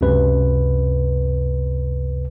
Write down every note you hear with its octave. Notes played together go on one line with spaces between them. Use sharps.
C#2 F#2 C3 B4